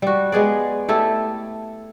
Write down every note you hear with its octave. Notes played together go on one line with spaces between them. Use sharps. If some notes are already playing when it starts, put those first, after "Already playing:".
G3 F#4
G#3 B3 G#4 D5
A3 E4 G4 A4